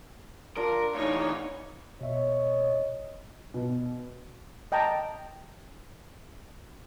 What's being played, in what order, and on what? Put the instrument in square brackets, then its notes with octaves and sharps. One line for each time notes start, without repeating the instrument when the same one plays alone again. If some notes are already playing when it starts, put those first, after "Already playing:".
[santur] D4 F4 F5 [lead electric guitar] A#4
[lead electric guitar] D2 E3 [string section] D#4 C#5 [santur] F5
[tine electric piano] B2 E5 [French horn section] C#5 D#5
[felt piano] B2
[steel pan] D#5 G5 A5 A#5